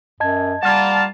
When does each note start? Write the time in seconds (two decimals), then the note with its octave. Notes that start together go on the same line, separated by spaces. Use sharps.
0.20 F#2 D#5 A5 G#6
0.63 G3 A#3 F4 F#5 A5 F6